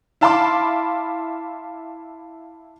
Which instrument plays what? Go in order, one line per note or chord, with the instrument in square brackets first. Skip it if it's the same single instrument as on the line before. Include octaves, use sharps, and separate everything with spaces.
[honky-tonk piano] E4 F5 A5 B5 C6 D6